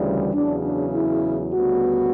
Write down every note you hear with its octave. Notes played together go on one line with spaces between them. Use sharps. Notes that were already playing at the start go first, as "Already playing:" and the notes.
Already playing: D2 C#3 E3 G3
E2 C#3 F#3 D4
D4
E4
D2 C#3 G3 B3 F#4